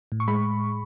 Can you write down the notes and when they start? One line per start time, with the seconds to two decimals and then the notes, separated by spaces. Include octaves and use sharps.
0.12 A2
0.20 C#6
0.28 G#3 B5